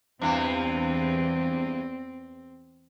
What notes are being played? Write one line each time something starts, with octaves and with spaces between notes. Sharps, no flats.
E2 G2 E3 C4